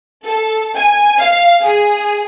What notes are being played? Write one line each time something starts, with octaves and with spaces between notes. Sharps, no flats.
A4
G#5
F5
G#4